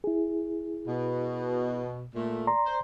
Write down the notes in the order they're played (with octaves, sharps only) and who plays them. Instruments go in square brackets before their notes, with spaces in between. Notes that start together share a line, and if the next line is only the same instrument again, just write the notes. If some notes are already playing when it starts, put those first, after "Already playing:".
[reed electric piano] E4 G#4
[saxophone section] B2
A#2 A3
[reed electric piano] D5 A#5 C6
[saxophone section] C5